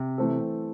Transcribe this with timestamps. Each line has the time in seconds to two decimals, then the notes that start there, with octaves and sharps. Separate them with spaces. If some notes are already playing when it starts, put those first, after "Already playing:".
Already playing: C3
0.18 E3 A3 C4 A4